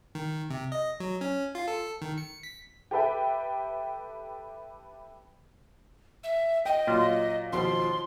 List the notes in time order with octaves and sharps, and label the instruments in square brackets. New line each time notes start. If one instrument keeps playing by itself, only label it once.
[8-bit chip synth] D#3
C3
D#5
F#3
C#4
F4
A4
D#3
C#7
B6
[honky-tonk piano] G4 A4 B4 E5 G5
[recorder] E5
[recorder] D#5 [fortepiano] G5
[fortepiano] A#2 F#3 [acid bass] F4
[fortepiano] D#2 B2 F3 [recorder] C6